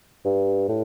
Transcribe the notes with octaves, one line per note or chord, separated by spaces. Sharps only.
G2
A2